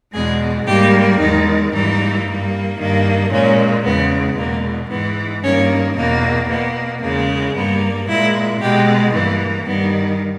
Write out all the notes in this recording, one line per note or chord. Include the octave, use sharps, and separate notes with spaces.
E2 B2 G#3 G#4
G#2 G3 A#3 G4
E2 D#3 G#3 D#4
G#2 E3 G3 A#3 D#4
G2 G3 A#3
G2 D#3 A#3
A#2 G#3 C#4
E2 C#3 G#3 B3
E2 B2 G#3 A#3
G#2 E3 G#3 B3
G2 D#3 A#3 C#4
E2 B2 A#3
B2 A#3 B3
E2 C#3 G#3 A#3
G2 G3 A#3 B3
A#2 G#3 E4
B2 G#3 G4
G2 E3 A#3 B3
G2 D#3 G3 B3